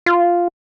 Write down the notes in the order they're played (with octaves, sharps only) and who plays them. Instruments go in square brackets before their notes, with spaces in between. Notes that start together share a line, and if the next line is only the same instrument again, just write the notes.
[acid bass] F4